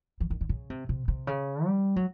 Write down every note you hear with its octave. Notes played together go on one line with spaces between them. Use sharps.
E3
D#3
D3
C#3
C3
C3
C3
C#3
G3
F#3